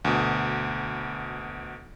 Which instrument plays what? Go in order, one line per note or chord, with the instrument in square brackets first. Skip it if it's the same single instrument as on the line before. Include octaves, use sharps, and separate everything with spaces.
[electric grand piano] D2 B2